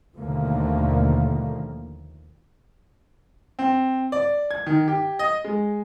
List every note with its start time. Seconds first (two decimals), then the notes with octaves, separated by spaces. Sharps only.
0.16 D#2 B2 D3 F3 A3 A#3
3.59 C4
4.12 D5
4.51 G#6
4.66 D#3
4.88 G4
5.19 D#5
5.45 G#3